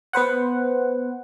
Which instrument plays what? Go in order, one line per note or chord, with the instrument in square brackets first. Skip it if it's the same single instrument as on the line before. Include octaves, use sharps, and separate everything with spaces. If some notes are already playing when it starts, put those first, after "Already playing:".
[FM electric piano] B3 B4 C5 F#5